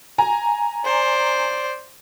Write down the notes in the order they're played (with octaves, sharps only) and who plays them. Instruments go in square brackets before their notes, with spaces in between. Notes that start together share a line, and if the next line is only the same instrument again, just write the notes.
[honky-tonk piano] G#5 A#5
[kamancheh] C5 D5